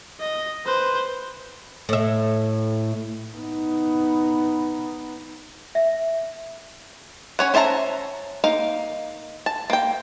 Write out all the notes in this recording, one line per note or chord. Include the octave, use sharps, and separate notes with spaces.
D#5
B4 C5
A2 E5
B3 D#4
E5
C#4 C#5 F#5
C#4 C5 E5 A5 A#5
A#3 D#4 F5
A5
A#3 G5